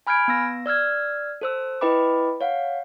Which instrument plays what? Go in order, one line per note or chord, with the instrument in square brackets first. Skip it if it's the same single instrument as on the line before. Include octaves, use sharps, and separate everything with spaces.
[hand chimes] G#5 B5 F6 G6 G#6 D7
B3 E6 A#6
D5 E6 F6 G#6
A4 C5 E6
E4 B4 D#5 G5 B5 D6
C#5 F5 F#5